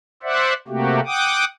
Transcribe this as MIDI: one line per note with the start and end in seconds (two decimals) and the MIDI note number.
0.23 0.53 72
0.23 0.53 74
0.23 0.53 76
0.23 0.53 78
0.68 1.00 48
0.68 1.00 57
0.68 1.00 58
0.68 1.00 66
0.68 1.00 67
1.06 1.45 78
1.06 1.45 79
1.06 1.45 86
1.06 1.45 87